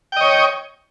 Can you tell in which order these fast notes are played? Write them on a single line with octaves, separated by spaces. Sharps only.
G5 D#5 C#5